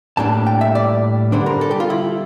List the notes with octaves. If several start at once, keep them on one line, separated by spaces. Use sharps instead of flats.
A2 G3 A#3 D4 A5
G5
E5
D5
D3 G3 D4 C5
A#4
A4
G4
F4
E4